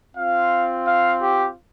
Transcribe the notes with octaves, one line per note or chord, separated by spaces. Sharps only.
C4 F4 F5
F5
G4